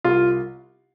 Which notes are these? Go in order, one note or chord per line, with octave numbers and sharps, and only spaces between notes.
C2 F4